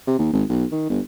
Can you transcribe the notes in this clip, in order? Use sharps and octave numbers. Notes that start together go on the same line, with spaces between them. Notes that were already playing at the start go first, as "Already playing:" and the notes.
C3
D#2
G#1
B1
D#3
G1